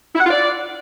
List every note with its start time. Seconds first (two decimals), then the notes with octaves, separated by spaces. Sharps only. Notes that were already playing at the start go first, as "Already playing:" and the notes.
0.15 E4
0.20 F#5
0.25 F4
0.30 D5